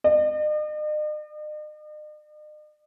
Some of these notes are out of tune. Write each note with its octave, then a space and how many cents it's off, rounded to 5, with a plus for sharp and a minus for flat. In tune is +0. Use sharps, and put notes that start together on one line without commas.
D#5 -45